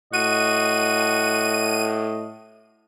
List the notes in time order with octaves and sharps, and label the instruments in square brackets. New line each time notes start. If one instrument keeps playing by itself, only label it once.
[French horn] A2 [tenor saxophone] F#4 [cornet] D#5 [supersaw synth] D#7